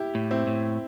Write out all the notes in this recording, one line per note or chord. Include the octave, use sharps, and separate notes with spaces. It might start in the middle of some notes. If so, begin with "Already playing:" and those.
Already playing: E4 G4
A2
C4 E4
A2